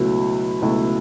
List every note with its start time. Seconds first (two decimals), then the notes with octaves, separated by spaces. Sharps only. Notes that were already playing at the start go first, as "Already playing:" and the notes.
Already playing: C#2 B2 F#3 A3 E4
0.62 C#2 B2 F#3 A3 E4